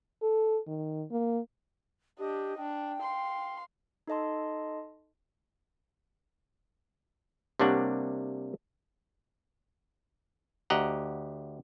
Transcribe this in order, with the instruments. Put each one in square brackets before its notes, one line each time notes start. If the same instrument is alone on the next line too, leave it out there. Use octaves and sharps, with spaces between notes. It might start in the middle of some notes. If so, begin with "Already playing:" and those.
[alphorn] A4
D#3
A#3
[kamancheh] D4 D#5 [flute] G4
[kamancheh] D4 [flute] G5
[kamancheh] F5 C6
[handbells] D#4 A4 D#5 A5 C6
[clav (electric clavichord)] C3 G3 A#3 D4 C#5 F#5
D2 G4 D#5 F#5 A#5